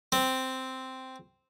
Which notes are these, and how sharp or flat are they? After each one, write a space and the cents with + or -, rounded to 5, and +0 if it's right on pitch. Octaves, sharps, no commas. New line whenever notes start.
C4 -5